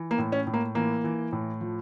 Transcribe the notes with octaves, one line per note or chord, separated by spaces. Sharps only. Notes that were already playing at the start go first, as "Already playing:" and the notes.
Already playing: E3
A#3
A2
C#4
A2
A#3
E3 A#3
E3
A2
F3